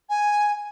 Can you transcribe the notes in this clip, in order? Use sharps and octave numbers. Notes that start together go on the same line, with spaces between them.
G#5